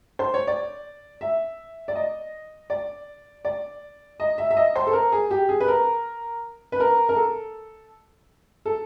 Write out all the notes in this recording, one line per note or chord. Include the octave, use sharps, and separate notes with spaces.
C5
C#5
D5
E5
D5
D#5
D5
D5
D#5
E5
E5
D#5
C5
A4
A#4
G#4
G4
G#4
B4
A#4
B4
A#4
A#4
A4
A4